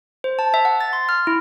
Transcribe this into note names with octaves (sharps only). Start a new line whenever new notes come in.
C5
A5
E5
F#5
A6
C6
F6
E4